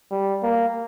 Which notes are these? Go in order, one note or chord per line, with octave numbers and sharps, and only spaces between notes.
G3
A#3